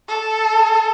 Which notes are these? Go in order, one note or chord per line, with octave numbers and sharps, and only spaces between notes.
A4